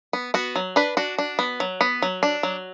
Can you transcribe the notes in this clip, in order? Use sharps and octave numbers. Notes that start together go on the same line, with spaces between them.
B3
B3 F#4
F#3
D4 B4
D4 F#4
D4
B3
F#3
B3
F#3
D4
F#3